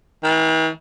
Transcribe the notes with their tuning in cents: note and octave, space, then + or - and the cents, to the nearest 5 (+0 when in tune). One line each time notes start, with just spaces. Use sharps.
E3 -45